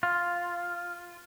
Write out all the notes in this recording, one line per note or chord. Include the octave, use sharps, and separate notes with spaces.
F4